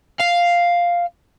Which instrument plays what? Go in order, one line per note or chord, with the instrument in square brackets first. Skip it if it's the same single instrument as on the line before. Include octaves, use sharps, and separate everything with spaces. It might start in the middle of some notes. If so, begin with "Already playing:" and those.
[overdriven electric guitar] F5